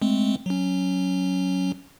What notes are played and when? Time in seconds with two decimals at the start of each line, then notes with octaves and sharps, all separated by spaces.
0.02 G#3 A3 C4
0.46 F#3 C#4